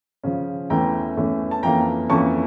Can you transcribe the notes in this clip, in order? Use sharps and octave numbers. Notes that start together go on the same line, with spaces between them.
C#3 F3 C#4
E2 E3 A3 C#4 G5 A#5
E2 E3 A3 C#4
A5
F2 E3 A#3 C#4 G5 A#5
F2 E3 A#3 C#4 A5 C#6